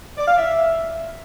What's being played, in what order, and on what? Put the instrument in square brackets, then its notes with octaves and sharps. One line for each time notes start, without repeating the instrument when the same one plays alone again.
[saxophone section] D5
F5
E5